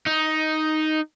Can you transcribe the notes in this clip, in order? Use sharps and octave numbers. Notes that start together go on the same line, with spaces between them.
D#4